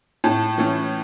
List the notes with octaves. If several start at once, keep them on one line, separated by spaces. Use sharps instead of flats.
A2 A5
E3 A3 C#4